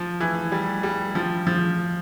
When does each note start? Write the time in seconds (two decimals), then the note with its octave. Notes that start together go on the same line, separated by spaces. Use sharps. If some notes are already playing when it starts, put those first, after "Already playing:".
Already playing: F3
0.20 E3
0.52 G3
0.83 G3
1.15 F3
1.47 F3